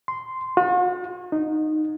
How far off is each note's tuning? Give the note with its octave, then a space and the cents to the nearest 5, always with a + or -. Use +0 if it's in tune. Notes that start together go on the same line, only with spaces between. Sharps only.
C6 -10
F#4 -45
D#4 -10